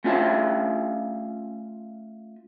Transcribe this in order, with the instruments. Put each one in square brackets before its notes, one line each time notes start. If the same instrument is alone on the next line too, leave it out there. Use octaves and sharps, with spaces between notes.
[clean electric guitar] A3 C#4 F4 E5 F5 A5